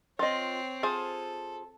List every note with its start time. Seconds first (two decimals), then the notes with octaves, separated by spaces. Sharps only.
0.19 C4 F4 C#5 D#5
0.83 F4 G#4 A4 C5